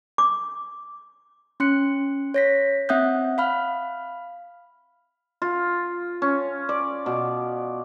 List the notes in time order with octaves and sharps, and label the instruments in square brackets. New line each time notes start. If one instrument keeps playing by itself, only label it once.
[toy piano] D6
[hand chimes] C#4 C6 F#6 C#7
C#5 A#6 B6
C4 E5 F#5 D#6 F#6 G6
F5 B5 F6
[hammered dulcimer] F4
C#4
D5
B2